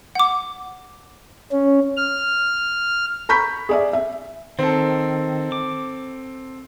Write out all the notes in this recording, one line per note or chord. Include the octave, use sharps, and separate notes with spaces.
F#5 D6
C#4
F6
A#5 B5 C#6 G6 B6
G#4 D5 E5
E5
D#3 C4 A4
D6